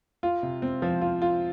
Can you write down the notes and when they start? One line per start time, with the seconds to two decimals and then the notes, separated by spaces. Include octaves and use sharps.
0.23 F4
0.43 C3
0.62 C4
0.82 F3
1.01 F4
1.22 F4